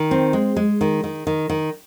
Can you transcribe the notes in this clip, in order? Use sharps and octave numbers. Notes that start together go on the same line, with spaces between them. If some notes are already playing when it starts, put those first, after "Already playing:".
Already playing: D#3
C4
G#3
G#3
D#3
D#3
D#3
D#3